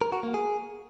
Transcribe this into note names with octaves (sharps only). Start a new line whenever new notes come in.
A#4
F#4
A#3
G#4